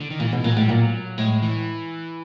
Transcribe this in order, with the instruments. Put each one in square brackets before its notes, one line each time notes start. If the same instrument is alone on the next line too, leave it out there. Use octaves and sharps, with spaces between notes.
[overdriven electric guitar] D3
D#3
[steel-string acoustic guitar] A#2 [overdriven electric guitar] E3
[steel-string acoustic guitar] B2
[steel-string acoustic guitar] A#2 [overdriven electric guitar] F#3
[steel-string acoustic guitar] A2 [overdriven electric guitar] G3
[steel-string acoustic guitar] A#2 [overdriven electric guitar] F#3
[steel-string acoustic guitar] A2 [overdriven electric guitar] G#3
[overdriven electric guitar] E3